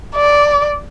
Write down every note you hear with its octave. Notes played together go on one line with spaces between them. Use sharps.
D5